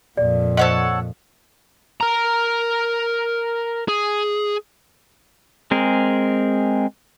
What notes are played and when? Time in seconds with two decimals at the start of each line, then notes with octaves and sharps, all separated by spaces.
0.17 F2 A#2 D5
0.57 A4 C5 C#5 D#5 F#5
2.01 A#4 A#5
3.88 G#4
5.71 G#3 C4 G#4 A#4